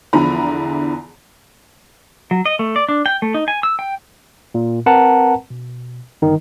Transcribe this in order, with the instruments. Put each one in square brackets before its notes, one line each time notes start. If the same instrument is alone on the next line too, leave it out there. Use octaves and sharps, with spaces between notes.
[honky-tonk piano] E2 D3 F3 E4 A#5 B5
[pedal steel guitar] F#3
D#5
A3
D5
D4
G5
A3
D#4
G#5
E6
G5
[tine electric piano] A#2
C4 A#4 B4 F#5 A5 A#5
B2
G1 D#3 D#4